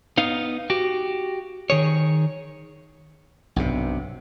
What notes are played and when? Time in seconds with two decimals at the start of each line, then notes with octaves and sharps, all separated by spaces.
0.17 B3 D#4 F5
0.70 F#4 G4
1.70 D#3 G#4 C#5
3.56 B1 G2 C3